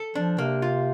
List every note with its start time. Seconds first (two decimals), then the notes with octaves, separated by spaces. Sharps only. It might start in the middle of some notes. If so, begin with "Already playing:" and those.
Already playing: A4
0.15 F3 D4
0.38 C3 A#3
0.62 F4